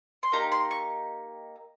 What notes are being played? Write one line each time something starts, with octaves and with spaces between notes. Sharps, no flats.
C6
A#3 D#4 G4 A#5
C6
C#6